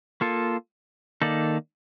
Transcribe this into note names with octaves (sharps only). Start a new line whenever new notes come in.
A#3 F4 A4
D#3 A#3 D#4 A4 D5